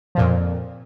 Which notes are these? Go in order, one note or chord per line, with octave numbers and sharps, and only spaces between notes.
F2 A#2 F3